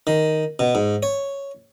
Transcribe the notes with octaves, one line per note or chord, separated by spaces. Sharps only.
D#3
B2
G#2
C#5